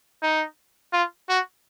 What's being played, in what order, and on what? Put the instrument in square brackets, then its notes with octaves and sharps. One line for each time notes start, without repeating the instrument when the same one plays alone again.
[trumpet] D#4
F4
F#4